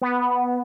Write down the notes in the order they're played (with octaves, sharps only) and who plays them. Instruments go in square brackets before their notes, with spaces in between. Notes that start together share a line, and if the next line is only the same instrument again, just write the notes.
[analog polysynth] B3